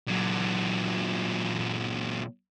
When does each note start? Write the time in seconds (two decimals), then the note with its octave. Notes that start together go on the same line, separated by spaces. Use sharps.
0.08 A#2 F#3